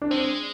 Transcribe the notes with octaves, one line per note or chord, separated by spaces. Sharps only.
D4
G#3 C4